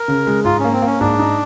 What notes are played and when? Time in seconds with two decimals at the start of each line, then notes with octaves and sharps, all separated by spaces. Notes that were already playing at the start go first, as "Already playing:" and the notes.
Already playing: A#4
0.08 C#3
0.27 G#3
0.45 G#2 F4
0.60 A#3 C#4
0.73 C4
0.82 A#3 C#4
1.00 G#2 D4
1.19 D#4